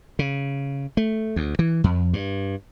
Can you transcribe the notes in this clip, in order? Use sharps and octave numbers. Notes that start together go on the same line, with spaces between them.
C#3
A3
D2
E3
F2
G2